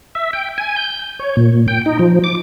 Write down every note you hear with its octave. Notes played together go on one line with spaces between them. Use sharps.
E5
G5
G#5
G6
C#5
A#2
G5
D#4
F3
D6